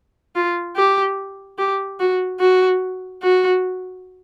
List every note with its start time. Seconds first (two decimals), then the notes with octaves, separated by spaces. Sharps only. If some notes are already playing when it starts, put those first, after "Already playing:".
0.35 F4
0.75 G4
1.58 G4
2.00 F#4
2.40 F#4
3.22 F#4